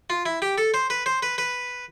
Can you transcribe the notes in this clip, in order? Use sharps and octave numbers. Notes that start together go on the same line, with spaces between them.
F4
E4
G4
A4
C5
B4
C5
B4
B4